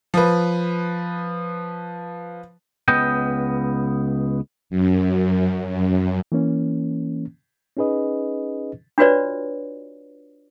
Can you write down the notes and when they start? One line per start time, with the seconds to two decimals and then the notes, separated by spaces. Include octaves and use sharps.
0.14 F3 B4
2.88 C#2 B3 D#5 G5
4.70 F#2
5.68 F#2
6.32 E3 A#3 C#4
7.77 C#4 D#4 G#4 B4 D#5
8.98 D4 F4 F#4 B4 C#5 D5